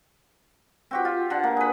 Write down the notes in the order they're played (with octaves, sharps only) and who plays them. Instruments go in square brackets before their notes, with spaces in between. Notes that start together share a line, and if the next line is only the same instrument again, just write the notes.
[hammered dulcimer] C4 F#4 G4
F4
D3 F#5
A#3
G#4 B4